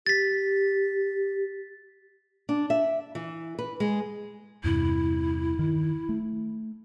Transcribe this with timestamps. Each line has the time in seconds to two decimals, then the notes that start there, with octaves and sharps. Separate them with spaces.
0.06 G4 A6 B6
2.49 D4
2.70 E5
3.15 E3
3.59 B4
3.80 G#3
4.64 E2 G2 C3 E4
5.59 D#3
6.09 A3